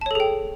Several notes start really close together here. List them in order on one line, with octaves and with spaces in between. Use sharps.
A5 C#5 A4 G#4 G5